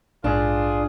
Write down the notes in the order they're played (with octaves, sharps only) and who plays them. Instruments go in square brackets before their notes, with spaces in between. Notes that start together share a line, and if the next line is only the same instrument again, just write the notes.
[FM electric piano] A#1 G#2 [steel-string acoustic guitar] D4 [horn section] F4 G#4